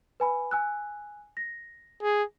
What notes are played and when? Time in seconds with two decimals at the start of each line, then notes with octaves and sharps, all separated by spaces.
0.20 B4 G#5 B5
0.51 G#5 E6 F#6
1.37 A#6
2.02 G#4